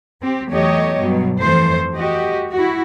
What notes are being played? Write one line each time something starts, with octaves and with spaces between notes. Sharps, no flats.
C4 G4
E2 F#3 A3 G4 C#5 D#5
G2 B2 F#3
F2 E3 A3 C5
F#4 G4 D#5
E4 F#4